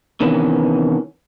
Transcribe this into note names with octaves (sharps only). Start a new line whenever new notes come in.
C3 D#3 E3 B3 C#4